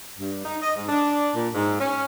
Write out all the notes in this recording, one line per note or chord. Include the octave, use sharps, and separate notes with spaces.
G2
D#4
D#5
G#2
D4
A#2
G#2
C#4